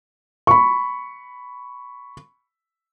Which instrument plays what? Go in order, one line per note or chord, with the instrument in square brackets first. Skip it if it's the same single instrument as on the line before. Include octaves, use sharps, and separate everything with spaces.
[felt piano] B5 C#6